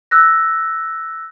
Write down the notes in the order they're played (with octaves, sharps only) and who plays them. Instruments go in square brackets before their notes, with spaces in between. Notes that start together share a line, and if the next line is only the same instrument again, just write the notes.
[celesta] E6 F#6 A#6